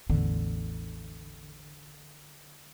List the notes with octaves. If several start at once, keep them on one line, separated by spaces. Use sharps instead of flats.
A1 E2 D3